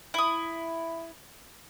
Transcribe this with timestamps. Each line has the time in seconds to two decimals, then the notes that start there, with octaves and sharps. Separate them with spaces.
0.14 E4 D#6